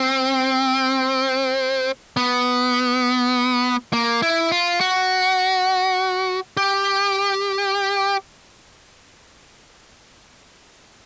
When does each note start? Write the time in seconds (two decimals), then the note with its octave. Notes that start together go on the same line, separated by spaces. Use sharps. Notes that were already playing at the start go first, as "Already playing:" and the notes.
Already playing: C4
2.17 B3
3.93 A#3
4.22 E4
4.52 F4
4.81 F#4
6.57 G4